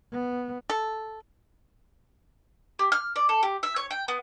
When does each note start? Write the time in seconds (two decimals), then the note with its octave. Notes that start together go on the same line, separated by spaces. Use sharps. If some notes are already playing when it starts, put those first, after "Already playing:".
0.12 B3
0.70 A4
2.79 G4
2.92 F6
3.16 D5
3.29 A4
3.43 G4
3.63 E5
3.76 C#5
3.91 G5
4.08 B3